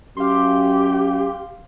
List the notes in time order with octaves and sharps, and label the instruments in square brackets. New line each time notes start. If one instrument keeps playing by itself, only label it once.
[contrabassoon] F#2 [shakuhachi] G4 [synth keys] F5 C6